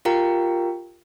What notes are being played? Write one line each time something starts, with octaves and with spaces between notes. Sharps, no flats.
F4 G4 A#4 F5 G5 A#5